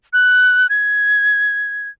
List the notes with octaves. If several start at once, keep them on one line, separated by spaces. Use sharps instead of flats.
F#6
G#6